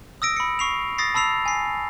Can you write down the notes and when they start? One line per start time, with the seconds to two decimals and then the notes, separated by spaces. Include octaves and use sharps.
0.22 D#6 E6 A#6 D7
0.37 B5 C#7
0.59 C#6 C7 F7
0.98 D#6 A6 A#6 C7
1.14 A5 B5 E6 C7 F7
1.46 G#5 C7